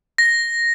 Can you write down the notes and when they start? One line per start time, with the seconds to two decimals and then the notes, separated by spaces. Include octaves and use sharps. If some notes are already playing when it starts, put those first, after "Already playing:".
0.18 A#6